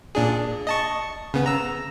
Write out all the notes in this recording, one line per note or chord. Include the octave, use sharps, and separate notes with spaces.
A#2 D4 G#4
D#5 A5 C#6
C#3 B3
A#5 E6